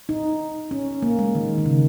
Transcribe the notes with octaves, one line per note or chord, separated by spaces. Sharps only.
D#4
C#4
A#3
G#3
D#3
D#3
C#3